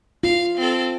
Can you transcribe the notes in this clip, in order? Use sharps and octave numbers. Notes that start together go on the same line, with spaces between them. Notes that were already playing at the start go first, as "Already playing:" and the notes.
F4 F5
C4 A4